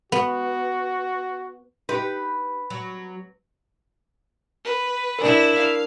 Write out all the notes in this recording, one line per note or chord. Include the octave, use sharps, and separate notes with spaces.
B3 F#4
D#4 G4 B4
F#3
B4
D4 E4 A#4
F5